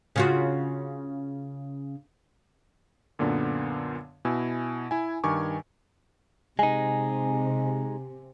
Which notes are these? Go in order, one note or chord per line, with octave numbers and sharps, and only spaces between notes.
C#3 F4 F#4
F#2 A#2 D3 B3 D4
B2 E4 G#5 E6
E4 G#5
G2 D#3 G#5 C#6 D6
C3 G#3 D#4 G#5